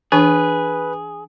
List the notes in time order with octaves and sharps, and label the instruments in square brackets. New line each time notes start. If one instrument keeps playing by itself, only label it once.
[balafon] E3 D4 G#5 [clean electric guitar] G#4 [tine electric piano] B4